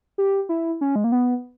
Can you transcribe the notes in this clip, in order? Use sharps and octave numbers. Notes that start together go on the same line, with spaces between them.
G4
E4
C#4
G#3
A#3
B3